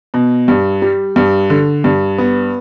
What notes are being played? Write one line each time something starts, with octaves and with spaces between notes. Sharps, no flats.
B2
G2
G3
G2
D3
G2
B3